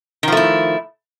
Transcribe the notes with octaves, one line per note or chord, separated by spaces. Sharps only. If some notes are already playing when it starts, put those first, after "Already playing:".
D#3 F3 A3 E4